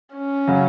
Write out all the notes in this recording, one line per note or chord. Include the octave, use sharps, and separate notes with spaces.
C#4
C#3 F#3